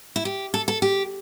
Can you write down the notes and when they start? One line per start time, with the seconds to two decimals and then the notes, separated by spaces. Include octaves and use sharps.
0.16 E4
0.25 G4
0.54 A4
0.68 A4
0.82 G4